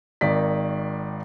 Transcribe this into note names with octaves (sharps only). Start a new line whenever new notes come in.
G#1 D#3 D5 B6